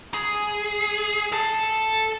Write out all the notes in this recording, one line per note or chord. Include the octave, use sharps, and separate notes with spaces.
G#4
A4 A5